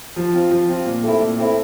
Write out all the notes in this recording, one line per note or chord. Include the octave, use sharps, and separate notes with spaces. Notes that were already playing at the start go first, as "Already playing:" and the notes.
F3
C4 F4
F3
C4 F4
A#2
A3 C4 E4
A#2
A3 C4 E4